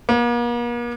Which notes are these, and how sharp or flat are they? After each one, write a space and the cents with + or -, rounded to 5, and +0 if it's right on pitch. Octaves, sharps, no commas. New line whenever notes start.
A#3 +45